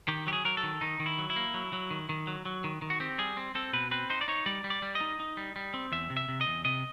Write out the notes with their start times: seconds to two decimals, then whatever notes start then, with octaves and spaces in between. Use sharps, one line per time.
0.08 D#3 G4
0.27 F#3 G4
0.33 G#4
0.45 F#3 A#4
0.57 A4
0.63 D#3
0.81 D#3 D#4
1.00 D#3
1.06 E4
1.18 F#3
1.30 E4
1.36 A#3
1.54 F#3
1.73 F#3
1.91 D#3
2.09 D#3
2.27 F#3
2.45 F#3
2.64 D#3
2.82 D#3
2.90 F#4
3.00 C4 G4
3.18 G3 G#4
3.37 C4
3.55 C4 A4
3.73 B2 B4
3.91 C4 B4
4.10 D#4 C5
4.21 D5
4.28 D#4 C#5
4.46 G3 D5
4.64 G3
4.70 D5
4.82 G3
4.95 D#5
5.01 D#4
5.20 D#4
5.37 G3
5.56 G3
5.74 C4
5.92 E2 E5
6.10 C3
6.17 E5
6.29 C3
6.41 D#5
6.47 E2
6.65 C3 D#5